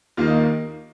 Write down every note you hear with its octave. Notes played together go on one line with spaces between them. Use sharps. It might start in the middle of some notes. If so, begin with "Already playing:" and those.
D#2 D#3 A#3 F4
D#4